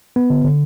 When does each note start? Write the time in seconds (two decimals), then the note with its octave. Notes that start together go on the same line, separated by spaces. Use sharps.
0.16 B3
0.30 D3
0.44 D3